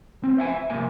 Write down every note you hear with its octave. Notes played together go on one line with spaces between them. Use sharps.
C4 C#4
C5 E5 F#5 G#5
E5
C2 F2 A#3 G#5